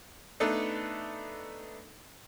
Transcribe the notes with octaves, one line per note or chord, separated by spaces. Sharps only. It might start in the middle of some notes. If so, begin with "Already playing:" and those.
A3 B3 D4 D#4 A4 B4